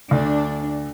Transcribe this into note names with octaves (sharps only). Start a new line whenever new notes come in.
D2 D4